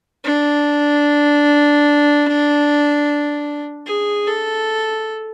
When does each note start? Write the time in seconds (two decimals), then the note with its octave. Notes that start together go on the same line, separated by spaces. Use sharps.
0.24 D4
3.86 G#4
4.27 A4